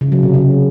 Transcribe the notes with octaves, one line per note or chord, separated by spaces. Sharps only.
C#3
F#3
C3
C#3